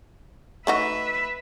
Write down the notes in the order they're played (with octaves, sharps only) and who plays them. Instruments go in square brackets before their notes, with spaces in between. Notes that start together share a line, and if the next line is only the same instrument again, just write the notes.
[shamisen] A3 D#4 F#4 [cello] B4 E5